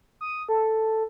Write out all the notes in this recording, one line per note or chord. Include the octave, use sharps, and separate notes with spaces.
D#6
A4